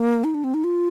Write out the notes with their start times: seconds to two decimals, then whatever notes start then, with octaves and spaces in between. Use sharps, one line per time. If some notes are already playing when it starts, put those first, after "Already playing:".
Already playing: A#3
0.24 D#4
0.34 D4
0.44 C4
0.54 D#4
0.64 F4